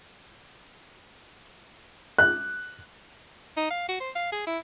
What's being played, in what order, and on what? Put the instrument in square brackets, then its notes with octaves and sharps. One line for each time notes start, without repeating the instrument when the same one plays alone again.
[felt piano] F#6
[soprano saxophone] D#4
F5
F#4
C5
F5
G#4
E4